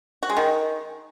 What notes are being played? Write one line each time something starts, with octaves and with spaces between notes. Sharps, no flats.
F#4
G#3
D#3